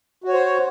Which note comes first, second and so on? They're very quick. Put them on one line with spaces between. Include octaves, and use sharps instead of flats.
F#4 C#5 C5